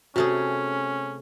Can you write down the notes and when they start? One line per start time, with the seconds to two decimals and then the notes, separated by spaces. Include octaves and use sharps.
0.16 C3 A3 C#4 F#4 G#4